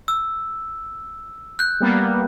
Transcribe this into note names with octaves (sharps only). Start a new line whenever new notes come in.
E6
F#6 G6
G3 A#3 B3